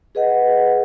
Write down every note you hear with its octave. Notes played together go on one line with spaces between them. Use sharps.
G#4 B4 D#5 F#5